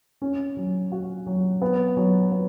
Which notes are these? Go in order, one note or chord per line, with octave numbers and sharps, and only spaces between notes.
C#4
F#3
F#4
F#3
B3
F#3
B3